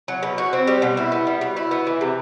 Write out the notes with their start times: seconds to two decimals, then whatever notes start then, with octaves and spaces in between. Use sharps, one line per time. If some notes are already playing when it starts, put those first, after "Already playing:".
0.08 F#3
0.23 B2
0.38 F#4
0.53 C4
0.67 G3
0.82 B2
0.97 E4
1.12 B3
1.27 G3
1.41 B2
1.56 E4
1.71 B3
1.87 E3
2.01 C3